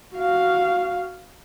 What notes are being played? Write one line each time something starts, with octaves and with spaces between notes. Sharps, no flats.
F#4 F5